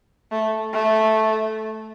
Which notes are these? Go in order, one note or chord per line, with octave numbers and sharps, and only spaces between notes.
A3
A3